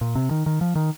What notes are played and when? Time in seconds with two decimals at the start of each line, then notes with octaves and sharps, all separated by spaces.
0.01 A#2
0.15 C3
0.31 D#3
0.46 D#3
0.61 F3
0.76 D#3